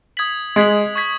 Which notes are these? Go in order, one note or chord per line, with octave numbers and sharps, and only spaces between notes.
D#6 G#6 B6 F#7
G#3 D#6 G#6 B6 F#7
C#6 G#6 B6